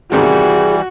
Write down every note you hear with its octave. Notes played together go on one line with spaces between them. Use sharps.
G#2 C3 D#3 E3 G3 F#4 G#4